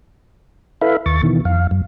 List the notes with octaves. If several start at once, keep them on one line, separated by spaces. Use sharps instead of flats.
E4 A4 B4 E5 F5 B5
D#2 C#6 A6
B2 D#3 E3
F2 F5
F#2